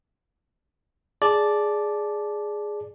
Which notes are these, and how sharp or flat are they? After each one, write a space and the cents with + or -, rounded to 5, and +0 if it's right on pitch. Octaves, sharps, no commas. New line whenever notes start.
G#4 +0 D5 +0 A5 -15